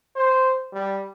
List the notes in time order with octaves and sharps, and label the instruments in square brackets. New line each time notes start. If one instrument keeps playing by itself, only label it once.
[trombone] C5
G3